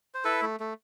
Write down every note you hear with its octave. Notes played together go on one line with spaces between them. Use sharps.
C5
E4 A4 B4
A3
A3